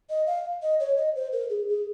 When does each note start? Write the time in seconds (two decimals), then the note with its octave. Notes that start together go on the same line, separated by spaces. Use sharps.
0.10 D#5
0.27 F5
0.62 D#5
0.80 C#5
0.97 D#5
1.16 C5
1.33 A#4
1.50 G#4
1.68 G#4